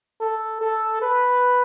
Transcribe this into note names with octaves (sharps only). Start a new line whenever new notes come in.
A4
A4
B4